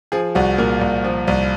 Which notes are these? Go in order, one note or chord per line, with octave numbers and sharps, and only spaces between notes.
F3 G#4
C2 F#4
A#2 A#4
C2
F3
C2